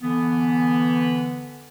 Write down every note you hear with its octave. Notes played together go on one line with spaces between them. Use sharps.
D3 E3 B3